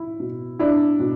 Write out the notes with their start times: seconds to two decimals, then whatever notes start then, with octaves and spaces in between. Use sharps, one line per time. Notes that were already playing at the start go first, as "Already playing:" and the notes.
Already playing: E4
0.20 B2
0.59 D4 E4
1.00 B2